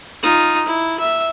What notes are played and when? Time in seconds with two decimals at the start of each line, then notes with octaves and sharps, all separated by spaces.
0.23 D#4 F4
0.66 E4
0.99 E5